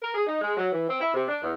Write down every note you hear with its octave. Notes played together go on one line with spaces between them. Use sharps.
A#4
G#4
D#4
G#3
F#3
E3
C4
E4
C3
D4
E2